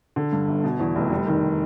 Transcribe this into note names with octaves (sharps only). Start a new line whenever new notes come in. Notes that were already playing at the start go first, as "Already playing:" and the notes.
D3
G2
G1
B2
E2
F1
G3
D#3